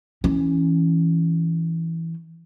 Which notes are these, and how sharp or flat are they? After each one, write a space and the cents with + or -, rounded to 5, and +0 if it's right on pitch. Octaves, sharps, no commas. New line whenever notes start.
E3 +0 C#4 +0